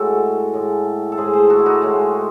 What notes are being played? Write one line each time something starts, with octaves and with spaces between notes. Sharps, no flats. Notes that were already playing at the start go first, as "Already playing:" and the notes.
Already playing: A2 G#3 F#4 A4
A2 G#3
A4
A2 G#3 G#4 C5
G#4 C5
F#4 A4
E4
D#4 F#4
A2 G#3